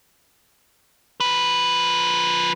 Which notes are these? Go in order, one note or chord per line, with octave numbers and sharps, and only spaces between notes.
F3 B4